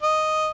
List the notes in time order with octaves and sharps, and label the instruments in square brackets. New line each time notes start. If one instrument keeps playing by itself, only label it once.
[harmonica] D#5